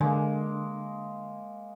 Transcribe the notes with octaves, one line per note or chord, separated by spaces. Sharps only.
D3 G#3 A#3